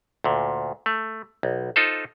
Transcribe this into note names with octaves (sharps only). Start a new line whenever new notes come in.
D2 A#2
A3
B1
D#4 F4 A4 C5